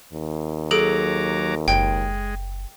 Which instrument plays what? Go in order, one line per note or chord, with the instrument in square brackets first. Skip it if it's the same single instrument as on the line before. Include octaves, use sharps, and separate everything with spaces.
[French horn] D#2
[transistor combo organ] F#3 A#5 D6 [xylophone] G#4 A4 D7
[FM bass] F#1 [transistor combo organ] G#3 [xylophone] G5